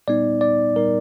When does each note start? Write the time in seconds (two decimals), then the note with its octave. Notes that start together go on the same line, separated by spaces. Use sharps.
0.08 A#2 G3 B3 D#4 D5
0.41 D5
0.75 A#2 G3 B3 D#4 A#4